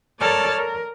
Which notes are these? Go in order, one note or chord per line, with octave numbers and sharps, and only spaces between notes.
A4 A#4 C#5 D5 A5 F6
A#4